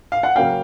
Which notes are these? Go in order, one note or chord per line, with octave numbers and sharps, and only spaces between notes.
F5
F#5
C#3 F#3 A#3 C#4 F5 G5